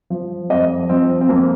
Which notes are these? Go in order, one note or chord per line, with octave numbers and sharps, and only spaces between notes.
F3
F2 D#5
F3 C4
C4
F2 A#3